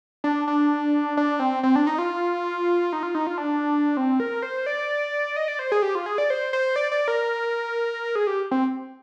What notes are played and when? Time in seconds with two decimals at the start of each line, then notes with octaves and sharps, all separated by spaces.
0.24 D4
0.47 D4
1.17 D4
1.40 C4
1.63 C4
1.76 D4
1.87 D#4
1.98 F4
2.93 D#4
3.03 F4
3.15 D#4
3.27 F4
3.38 D4
3.97 C4
4.20 A#4
4.43 C5
4.66 D5
5.36 D#5
5.48 D5
5.59 C5
5.72 G#4
5.82 G4
5.95 F4
6.06 G#4
6.18 D5
6.30 C5
6.53 C5
6.76 D5
6.92 D5
7.08 A#4
8.15 G#4
8.27 G4
8.51 C4